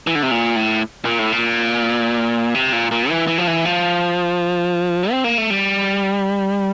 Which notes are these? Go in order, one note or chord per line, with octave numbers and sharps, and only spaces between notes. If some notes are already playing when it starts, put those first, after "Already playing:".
E3
D3
C3
A#2
A2
A#2
A2
A#2
C3
A#2
A#2
E3
E3
F3
E3
F3
C4
A#3
A3
G3